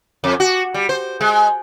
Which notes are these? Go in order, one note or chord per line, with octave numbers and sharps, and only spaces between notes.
F2
F#4
G3
C5
G#3